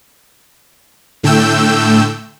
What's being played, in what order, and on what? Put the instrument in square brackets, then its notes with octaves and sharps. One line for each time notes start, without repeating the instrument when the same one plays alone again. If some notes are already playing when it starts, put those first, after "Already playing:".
[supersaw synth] A2 D3 A3 G5 E6 G6